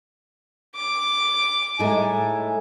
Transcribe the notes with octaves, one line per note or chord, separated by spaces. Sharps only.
D6
A2 G#3 D#4 A4 E5 G#5